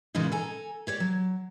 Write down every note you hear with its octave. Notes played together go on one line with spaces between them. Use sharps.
A#2 C#3 E3 G#3 D#4
A4 G#5 A#5
G4 C#5 D5
F#3